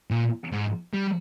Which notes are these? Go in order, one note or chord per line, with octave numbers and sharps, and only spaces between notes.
A#2
G#2
G3